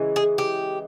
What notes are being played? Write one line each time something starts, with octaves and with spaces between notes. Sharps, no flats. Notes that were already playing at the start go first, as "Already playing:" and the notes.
Already playing: C#3 E3 G#3
G#4
G4